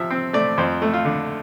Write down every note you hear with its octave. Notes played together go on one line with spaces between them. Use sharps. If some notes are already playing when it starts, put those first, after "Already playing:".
Already playing: C3 F3 E5
C4
A3 D5
F2 C5
A3
F4
D3